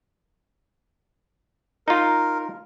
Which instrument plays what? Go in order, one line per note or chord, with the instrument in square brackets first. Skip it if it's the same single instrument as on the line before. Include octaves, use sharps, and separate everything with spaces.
[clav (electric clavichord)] D#4 F4 [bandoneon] A#4